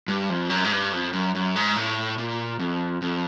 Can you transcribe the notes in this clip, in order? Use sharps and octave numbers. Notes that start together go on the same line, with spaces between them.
G2
F2
F#2
G#2
G2
F2
F#2
F#2
G#2
A2
A#2
F2
F2